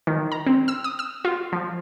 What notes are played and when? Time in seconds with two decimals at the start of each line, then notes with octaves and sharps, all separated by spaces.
0.07 D#3
0.32 A#5
0.46 C4
0.68 E6
0.84 D#6
0.99 E6
1.25 F4
1.52 F3